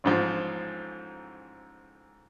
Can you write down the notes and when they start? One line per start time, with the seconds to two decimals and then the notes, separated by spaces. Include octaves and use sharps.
0.04 A1 G#2 F3